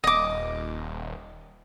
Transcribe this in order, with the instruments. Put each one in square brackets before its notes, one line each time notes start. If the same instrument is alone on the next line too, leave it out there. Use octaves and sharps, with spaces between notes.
[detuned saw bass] D#1 [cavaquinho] D#5 D6